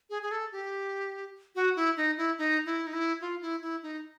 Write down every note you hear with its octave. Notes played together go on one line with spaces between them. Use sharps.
G#4
G#4
A4
G4
F#4
E4
D#4
E4
D#4
E4
D#4
E4
F4
E4
E4
D#4